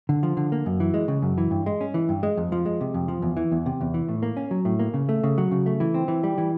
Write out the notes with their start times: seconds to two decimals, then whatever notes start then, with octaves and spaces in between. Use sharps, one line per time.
0.09 D3
0.23 F3
0.37 D3
0.52 A#3
0.66 F#2
0.80 E3
0.94 G#3
1.08 C#3
1.22 F#2
1.38 E3
1.51 G2
1.66 G#3
1.81 C#4
1.94 E3
2.09 G2
2.23 G#3
2.37 F2
2.52 F3
2.66 G#3
2.81 C3
2.94 F2
3.08 F3
3.22 E2
3.37 E3
3.52 E2
3.66 C3
3.81 E2
3.94 E3
4.09 A2
4.23 A#3
4.37 C#4
4.51 F#3
4.65 A2
4.79 A#3
4.94 C#3
5.09 A3
5.23 C#3
5.38 F#3
5.51 C#3
5.66 A3
5.80 E3
5.94 C4
6.08 E3
6.23 G3
6.38 E3